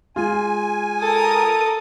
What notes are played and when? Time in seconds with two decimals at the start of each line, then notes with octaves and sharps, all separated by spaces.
0.16 G#3 F4 G#5
1.03 A4 A#4 D#6